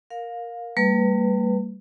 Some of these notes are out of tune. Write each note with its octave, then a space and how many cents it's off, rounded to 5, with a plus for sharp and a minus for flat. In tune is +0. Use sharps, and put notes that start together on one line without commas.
A#4 +0 F5 +20
G3 +0 A#3 -45 B4 +0